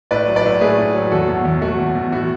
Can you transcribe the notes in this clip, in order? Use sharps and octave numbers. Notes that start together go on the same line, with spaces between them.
A2 B4 D5
F#3
B4 D5
A2
A3 G#4 B4
A2
F#3
E2 F#4 A4
B2
E2
A3 F#4
E2
B2
A2 F#4